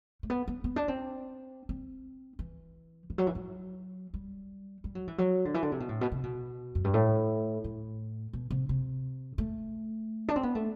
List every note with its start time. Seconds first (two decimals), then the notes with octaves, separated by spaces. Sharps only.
0.23 A3
0.30 B3
0.48 B3
0.64 B3
0.76 D4
0.88 C4
1.69 C4
2.39 E3
3.10 E3
3.18 F#3
3.27 E3
3.35 F#3
4.14 G3
4.84 G3
4.95 F#3
5.08 E3
5.18 F#3
5.45 D3
5.54 E3
5.63 D3
5.72 C3
5.80 B2
5.89 A2
6.01 B2
6.12 C3
6.23 B2
6.75 F#2
6.84 G2
6.94 A2
7.64 A2
8.33 B2
8.50 C3
8.69 C3
9.38 A3
10.28 D4
10.36 C4
10.43 B3
10.55 A3